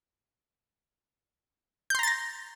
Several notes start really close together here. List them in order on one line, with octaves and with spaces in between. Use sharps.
G6 C6 A#5 A6 A#6